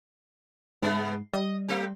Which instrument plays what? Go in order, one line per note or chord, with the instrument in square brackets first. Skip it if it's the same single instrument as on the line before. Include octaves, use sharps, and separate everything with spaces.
[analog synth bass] G#2 [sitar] C#3 G#3 B3
[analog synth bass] G3 [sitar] D#5
[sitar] A3 C4 G4